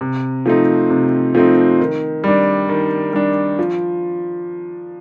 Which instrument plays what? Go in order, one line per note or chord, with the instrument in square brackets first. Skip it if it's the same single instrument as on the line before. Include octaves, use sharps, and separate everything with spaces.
[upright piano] C3
F3 A3 C4 D#4
C3
F3 A3 C4 D#4
D#3
G3 D4
D#3
G3 D4
F3